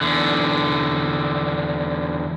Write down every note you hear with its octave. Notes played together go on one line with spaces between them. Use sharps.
E2 D3